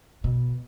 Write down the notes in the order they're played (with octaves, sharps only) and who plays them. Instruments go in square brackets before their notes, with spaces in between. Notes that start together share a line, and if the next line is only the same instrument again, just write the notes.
[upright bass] B2